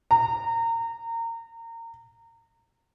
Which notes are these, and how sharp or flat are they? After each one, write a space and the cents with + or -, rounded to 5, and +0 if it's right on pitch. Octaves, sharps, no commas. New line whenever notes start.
A#5 -25